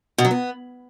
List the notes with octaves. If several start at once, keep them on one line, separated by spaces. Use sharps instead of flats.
B2
F#3
B3